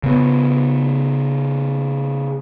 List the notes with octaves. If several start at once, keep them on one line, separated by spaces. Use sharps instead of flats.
C#3 B3